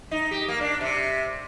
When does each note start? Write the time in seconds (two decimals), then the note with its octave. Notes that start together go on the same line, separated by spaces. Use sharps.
0.11 D#4
0.31 G4
0.48 A#3
0.61 D4
0.81 C3